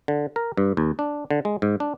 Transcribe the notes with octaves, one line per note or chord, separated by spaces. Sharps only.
D3
A#4
G2
D#2
D4
D3
G#3
G#2
D4